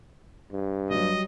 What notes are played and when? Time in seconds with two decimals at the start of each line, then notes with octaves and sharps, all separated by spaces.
0.52 G2
0.91 F#3 G3 D#5